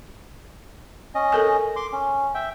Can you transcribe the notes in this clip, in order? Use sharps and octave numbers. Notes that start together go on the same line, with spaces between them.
C#4 D#5
A4 A#4 G#5
C6 D6
C#4
E5 G5